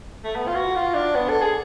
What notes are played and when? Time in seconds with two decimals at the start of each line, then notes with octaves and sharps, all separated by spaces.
0.24 A3
0.36 B3
0.47 F4
0.55 F#4
0.76 F4
0.95 D4
1.15 B3
1.29 A4
1.42 G#4